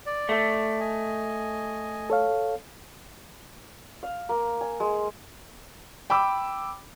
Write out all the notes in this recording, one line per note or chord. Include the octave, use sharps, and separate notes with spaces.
D5
A3
D#5 G#5
A4 C#5 F5
F5
A#3
G#5
G#3
G5 B5 D6 E6